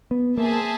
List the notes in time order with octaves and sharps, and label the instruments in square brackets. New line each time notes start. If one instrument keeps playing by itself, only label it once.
[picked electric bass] B3
[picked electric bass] A#3 [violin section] G#4 C5 E5 A5